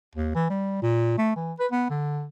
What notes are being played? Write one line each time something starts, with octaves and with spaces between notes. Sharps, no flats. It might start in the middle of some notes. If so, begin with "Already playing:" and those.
D#2
E3
G3
A#2
A3
E3
B4
B3
D3